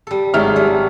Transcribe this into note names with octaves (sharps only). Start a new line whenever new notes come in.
G3 A4
G#1 F#3 G#3 E5 F6
G3 A4